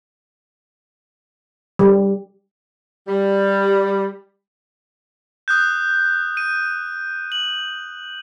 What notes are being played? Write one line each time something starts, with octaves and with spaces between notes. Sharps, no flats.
G3
G3
D#6 F#6 G6
D#7
F#7